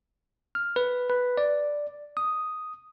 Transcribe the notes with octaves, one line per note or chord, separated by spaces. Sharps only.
F6
B4
B4
D5
D#6